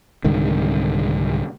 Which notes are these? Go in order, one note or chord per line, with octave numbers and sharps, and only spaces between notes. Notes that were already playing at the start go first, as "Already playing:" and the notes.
C2 G#2 D3 D#3